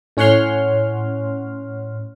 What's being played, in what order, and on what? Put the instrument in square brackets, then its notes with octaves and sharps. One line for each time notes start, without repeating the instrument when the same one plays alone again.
[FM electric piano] A2 C#4 C#5 F#5 C6 F6